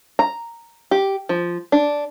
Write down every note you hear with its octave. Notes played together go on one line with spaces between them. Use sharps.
A#5
G4
F3
D4